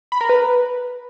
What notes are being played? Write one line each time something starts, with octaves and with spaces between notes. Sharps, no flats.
B5
A#4
B4